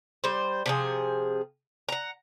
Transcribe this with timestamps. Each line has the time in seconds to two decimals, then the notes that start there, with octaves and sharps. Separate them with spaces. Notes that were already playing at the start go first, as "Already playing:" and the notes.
0.24 G3 C5
0.66 C3 F3 G#4
1.89 F#5 A#5